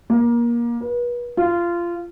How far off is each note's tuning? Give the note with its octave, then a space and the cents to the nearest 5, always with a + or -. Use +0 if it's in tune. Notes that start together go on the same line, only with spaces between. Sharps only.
A#3 +25
B4 -35
F4 -20